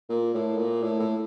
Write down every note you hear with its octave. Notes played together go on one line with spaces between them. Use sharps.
A#2
A2
A#2
A2
A2